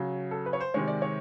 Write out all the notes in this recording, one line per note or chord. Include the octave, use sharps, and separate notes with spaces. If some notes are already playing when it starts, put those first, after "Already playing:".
Already playing: C#3 F#3
A4
B4
C#5
C5
C3 D#3 G#3 C#5
D5
C#5